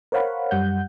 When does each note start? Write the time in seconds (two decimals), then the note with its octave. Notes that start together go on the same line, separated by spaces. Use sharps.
0.12 A#4 C5 C#5 F5 F#5 B5
0.51 F#2 G3 F#5 G6